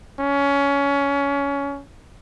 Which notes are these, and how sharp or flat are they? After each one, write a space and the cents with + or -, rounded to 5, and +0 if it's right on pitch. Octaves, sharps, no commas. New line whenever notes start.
C#4 +20